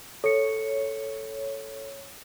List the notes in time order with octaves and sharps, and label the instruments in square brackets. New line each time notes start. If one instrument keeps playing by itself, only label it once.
[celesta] A4 C#7 [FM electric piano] C#5